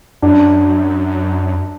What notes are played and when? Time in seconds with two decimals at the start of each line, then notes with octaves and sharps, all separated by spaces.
0.22 F#2 D4